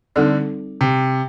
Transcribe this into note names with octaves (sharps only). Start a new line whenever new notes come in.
D3 G3 C4 D#4 A4 D5
C3